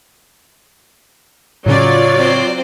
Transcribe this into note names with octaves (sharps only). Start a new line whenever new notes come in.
A2 C#3 F#3 C#4 F4 C#5 D5
C4 C5